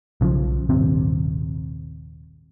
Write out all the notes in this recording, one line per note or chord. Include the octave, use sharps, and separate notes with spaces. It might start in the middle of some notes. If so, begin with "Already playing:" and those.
B1 C#3 E3 F3
D#1 G#1 C3 C4